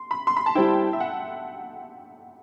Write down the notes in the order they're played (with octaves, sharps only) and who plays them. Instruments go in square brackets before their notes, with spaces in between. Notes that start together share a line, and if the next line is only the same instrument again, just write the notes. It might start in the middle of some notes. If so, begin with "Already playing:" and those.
Already playing: [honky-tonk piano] C6
B5
C6
B5
A5
[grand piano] G3 C4 E4 [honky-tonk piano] G5
[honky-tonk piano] E5
F#5